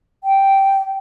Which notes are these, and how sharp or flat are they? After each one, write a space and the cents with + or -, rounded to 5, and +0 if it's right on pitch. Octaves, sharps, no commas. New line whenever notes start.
G5 -5